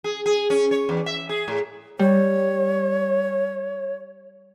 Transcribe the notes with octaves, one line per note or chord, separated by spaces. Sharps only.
G#4
G#4
C#4
C#5
E2
E5
G#4
A2
G3 C#5